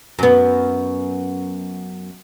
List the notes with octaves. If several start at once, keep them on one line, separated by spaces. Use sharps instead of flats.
F#2 B3